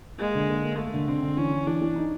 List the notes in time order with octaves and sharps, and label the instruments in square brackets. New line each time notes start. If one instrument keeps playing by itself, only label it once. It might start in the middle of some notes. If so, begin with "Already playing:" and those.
[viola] G#3 [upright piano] A#3
[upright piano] D3
A#3
A#3
[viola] A3 [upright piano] A#3
[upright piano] D3
[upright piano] D3 [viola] C4
[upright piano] D3
[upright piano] E3 [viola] C#4
[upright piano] E3
[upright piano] E3 [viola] D4
[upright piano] E3
D#4